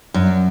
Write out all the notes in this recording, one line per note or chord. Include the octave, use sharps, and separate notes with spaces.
F#2